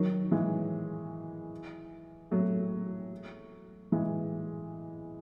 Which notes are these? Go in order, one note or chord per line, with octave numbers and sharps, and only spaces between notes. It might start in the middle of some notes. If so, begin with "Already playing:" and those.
Already playing: D#3 F#3
E3 G#3
F#3 A3
E3 G#3